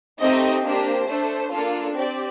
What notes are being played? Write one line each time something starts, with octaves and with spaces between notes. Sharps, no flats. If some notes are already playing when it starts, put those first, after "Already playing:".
A3 C4 D#4 G4 D#5
A#3 D4 G4 C5
A3 D4 A4
A#3 D4 F4 A4
C4 G4 D5